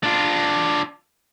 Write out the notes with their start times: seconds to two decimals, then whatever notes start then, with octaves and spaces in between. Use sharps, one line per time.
0.03 D4 F4